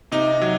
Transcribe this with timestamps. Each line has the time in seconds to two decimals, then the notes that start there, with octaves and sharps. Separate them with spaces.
0.12 C3 D#4
0.42 F#3